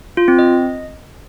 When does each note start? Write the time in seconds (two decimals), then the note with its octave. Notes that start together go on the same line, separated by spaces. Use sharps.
0.17 F4
0.28 C4
0.39 D#5